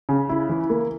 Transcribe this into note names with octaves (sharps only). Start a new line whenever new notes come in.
C#3
E4
E3
A#3